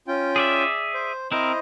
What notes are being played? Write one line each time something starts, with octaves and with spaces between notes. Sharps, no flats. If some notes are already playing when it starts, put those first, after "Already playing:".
C#4 F4 G5
G#4 D5 E5
C5
C4 E4 A#4 C5 D#5